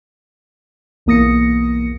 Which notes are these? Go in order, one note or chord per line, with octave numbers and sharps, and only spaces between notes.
B1 E2 A#3 D#6 A#6 C#7